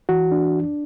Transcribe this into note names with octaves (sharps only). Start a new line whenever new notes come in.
E3 F#4
D4